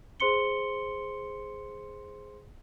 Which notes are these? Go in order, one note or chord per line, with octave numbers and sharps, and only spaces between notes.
G#4 C5 C6 C#7 G7